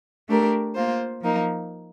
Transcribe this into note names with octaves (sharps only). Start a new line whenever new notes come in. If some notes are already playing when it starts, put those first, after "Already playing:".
A3 D4 G4 A#4
A#3 F4 C5
F3 A#3 D#4